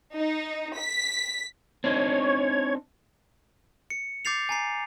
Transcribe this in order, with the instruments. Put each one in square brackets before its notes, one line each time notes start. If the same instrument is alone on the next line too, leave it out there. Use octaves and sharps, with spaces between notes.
[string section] D#4
B6
[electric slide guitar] C4 D4 D#4 [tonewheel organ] C#5
[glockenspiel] C#7
D6 G6 A6 C7 F7
G#5 A#5 C7